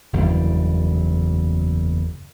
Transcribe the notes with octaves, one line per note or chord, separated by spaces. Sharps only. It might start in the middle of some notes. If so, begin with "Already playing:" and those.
F#1 E2 D3 G3